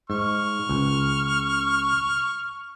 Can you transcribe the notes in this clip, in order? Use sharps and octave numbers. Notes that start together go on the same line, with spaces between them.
G#2 C#6 F6
C#2